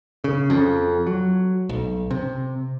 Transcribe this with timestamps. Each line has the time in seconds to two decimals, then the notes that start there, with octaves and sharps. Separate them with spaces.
0.24 C#3
0.50 F2
1.07 F#3
1.69 B1
2.11 C3